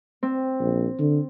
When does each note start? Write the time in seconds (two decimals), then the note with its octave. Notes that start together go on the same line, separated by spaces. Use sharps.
0.23 C4
0.60 A#1
0.99 D3